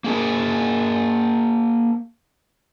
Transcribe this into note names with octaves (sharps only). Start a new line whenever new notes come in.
A#3 G#4 A#4